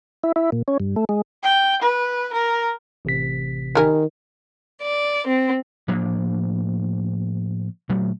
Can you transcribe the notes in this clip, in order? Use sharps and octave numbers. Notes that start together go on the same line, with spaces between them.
E4
E4
A#2
C#4
G2
A3
G#3
G5
B4
A#4
A1 C3 B6
D#3 G3 A#4 G#5
D5
C4
A2 F3 A#3 D4
A#2 F#3 A3